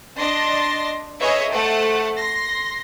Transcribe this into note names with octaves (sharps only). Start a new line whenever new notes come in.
D4 D#5 C6 A6 A#6
G#4 B4 C#5 D#5 E5
A3 A4 C5 F#5 A5
C6 A#6